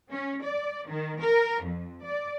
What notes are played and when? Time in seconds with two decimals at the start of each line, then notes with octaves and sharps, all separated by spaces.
0.11 C#4
0.45 D5
0.88 D#3
1.21 A#4
1.63 F2
2.03 D5